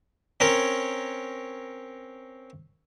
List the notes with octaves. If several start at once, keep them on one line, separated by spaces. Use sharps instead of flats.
C4 C#4 A#4 C#5